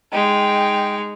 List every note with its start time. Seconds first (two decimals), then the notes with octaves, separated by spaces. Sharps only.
0.12 G#3 D#4 G5